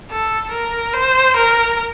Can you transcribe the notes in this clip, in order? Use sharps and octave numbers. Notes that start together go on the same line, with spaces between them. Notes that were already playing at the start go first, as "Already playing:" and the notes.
A4
A#4
C5
A#4